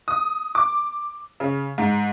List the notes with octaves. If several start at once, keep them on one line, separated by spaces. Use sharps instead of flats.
D#6
D6
C#3
G#2